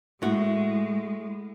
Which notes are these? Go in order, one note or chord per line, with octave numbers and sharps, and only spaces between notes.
A2 G#3 F#4